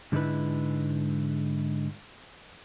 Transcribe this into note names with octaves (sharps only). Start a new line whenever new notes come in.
G#2 D3 G#3 D#4 E4 B4